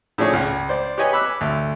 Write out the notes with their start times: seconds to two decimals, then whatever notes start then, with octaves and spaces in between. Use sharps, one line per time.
0.18 A2 C#3 F3 D4 G#4 C#5
0.33 C#2
0.69 C5 D5
0.98 G4 B4 C#5 D#5 G#5
1.13 B5 D6 E6 F#6
1.41 D2